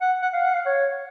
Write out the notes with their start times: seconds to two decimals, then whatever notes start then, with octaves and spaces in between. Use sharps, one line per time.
0.01 F#5
0.22 F#5
0.33 F5
0.44 F#5
0.54 F5
0.66 C#5